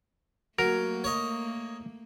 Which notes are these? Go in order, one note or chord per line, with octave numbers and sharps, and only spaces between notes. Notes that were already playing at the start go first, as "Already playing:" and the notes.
F#3 A3 A#3 A#4
C#5 D#5